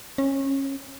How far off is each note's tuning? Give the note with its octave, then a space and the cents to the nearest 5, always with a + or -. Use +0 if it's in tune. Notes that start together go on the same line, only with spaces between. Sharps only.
C#4 -25